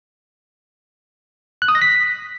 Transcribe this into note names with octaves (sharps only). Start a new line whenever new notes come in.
F#6
D#6
A#6
B6